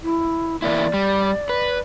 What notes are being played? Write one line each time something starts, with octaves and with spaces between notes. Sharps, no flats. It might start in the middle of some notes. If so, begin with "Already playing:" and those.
E4
E2 A#3 E4 D5
G3
B4